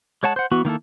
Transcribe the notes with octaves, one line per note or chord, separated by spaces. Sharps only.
G#3 C#5 F#5 A5
C5 F#5
E3 B3 F#4
D#3 A#3 E4 A4